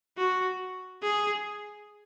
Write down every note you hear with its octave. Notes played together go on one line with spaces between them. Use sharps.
F#4
G#4